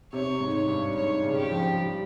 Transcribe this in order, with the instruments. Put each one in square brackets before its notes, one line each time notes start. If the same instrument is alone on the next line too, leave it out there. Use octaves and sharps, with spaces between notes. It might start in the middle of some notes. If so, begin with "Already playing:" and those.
[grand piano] C3 [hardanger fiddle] C#5
[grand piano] G#2
[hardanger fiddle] C#5
[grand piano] G2
[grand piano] G#2 [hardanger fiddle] C#5
[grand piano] C#3
[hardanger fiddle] G4
[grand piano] F3
G3